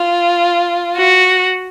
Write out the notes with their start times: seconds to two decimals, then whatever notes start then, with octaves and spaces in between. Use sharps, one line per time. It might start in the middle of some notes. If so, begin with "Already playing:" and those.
Already playing: F4
0.97 F#4